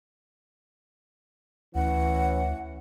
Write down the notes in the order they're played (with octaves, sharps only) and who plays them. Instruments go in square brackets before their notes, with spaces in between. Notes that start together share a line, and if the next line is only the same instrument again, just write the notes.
[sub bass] D2 [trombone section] E3 C#4 [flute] F#5